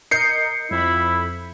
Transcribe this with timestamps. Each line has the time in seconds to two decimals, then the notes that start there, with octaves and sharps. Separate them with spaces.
0.11 A#4 D#5 G6 C7 C#7
0.71 F2 E4 B5